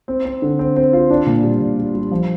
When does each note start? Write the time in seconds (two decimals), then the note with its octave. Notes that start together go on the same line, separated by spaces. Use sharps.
0.08 C4
0.25 C4
0.42 D3
0.59 C4
0.76 C4
0.93 F4
1.10 D4
1.26 A#2
1.43 G3
1.60 A#2
1.78 G3
1.94 G3
2.11 F3